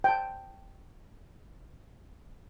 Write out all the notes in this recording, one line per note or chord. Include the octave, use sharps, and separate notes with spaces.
G5 A5